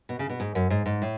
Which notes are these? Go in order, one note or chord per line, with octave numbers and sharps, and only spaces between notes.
B2
C#3
B2
G#2
F#2
G#2
G#2
A2